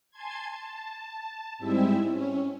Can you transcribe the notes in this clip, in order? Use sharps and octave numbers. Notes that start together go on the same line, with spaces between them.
G#5 A5 C6 G#6
A5
G#2 G3 G#3 C4 E4 E5
C#4